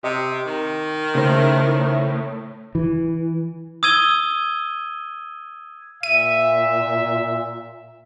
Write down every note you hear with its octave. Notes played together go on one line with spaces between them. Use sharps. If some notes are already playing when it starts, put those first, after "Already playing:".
C3 D#5
D#3
A2 C#3 C5
E3
D#6 E6 G#6 D#7 G7
A#2 E5 D#7